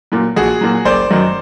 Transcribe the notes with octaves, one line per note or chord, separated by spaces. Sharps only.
A#2 F#3
A#1 F#4 G#4
A#2 F#3
F#1 C5 D5
F#2 D#3 F#3